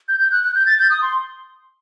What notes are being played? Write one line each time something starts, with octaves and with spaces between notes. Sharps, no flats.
G6
G6
F#6
F#6
G6
A6
G6
D#6
C6